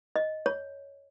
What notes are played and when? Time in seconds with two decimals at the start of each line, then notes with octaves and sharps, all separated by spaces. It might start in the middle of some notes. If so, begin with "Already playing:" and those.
0.16 D#5
0.46 C#5